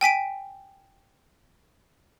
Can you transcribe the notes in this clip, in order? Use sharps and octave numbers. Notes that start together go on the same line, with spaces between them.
G5 G#5 B6 D7